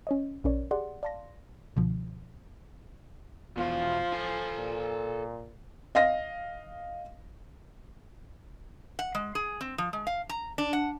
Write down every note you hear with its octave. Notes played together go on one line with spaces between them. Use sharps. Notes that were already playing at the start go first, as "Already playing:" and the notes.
C#4 C#5 D#5
A#1 B2 C#4 A#4 C#5 D5
G4 G#4 D5 F#5 C6
D5 F5 A5 C6 A#6
C#2 B2 D3 F3
E2 B2 F3 F4
A4 G#5
A#2
D#5 F5 A#6
F#5
G#3
G#4
C4
F3
G#3
F5
A#5
D4
F#5